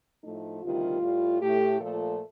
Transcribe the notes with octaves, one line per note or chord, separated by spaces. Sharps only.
A2 F3 A3 D#4
D2 C3 D#3 G3 F4
A2 G3
A2 A3 G4
A#2 F3 A3 A4